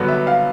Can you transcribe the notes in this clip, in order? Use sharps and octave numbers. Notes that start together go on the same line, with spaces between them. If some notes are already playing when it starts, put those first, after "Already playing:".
Already playing: G2 D3 F#3 B3
E5
F5